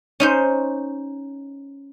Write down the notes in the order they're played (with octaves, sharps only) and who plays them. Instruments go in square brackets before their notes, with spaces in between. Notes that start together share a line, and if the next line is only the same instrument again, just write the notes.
[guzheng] C#4 D#4 C5